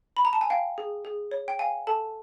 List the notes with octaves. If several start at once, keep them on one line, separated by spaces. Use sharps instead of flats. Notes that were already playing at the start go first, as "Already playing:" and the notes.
B5
A#5
A5
G#5
F5 G5
G#4
G#4
C#5
G5
F5 G#5
A4 A5